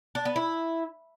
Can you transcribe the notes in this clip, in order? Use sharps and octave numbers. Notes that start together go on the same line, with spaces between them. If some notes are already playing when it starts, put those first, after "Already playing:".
D4
B3
E4